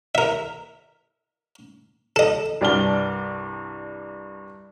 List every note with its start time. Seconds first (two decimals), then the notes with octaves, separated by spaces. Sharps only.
0.15 A#4 E5
2.16 A4 D#5
2.61 C2 G2 D5 A5 F6 G7